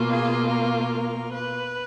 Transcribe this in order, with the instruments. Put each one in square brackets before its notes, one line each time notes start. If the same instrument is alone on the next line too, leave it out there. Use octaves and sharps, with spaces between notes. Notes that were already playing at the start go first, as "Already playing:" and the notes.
Already playing: [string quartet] B2 A#3 F4
G#4
A#4
B4